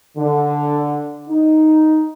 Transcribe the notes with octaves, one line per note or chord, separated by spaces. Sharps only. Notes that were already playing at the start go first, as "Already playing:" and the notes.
D3
D#4